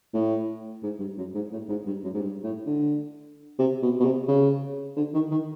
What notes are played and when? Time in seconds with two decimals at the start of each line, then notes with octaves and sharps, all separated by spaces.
0.14 A2
0.83 G#2
0.99 G2
1.18 F#2
1.34 G#2
1.52 A2
1.69 G#2
1.86 G2
2.03 F#2
2.14 G#2
2.20 G2
2.43 A2
2.66 D3
3.59 C3
3.82 B2
4.00 B2
4.04 C3
4.28 C#3
4.97 D3
5.14 D#3
5.31 D#3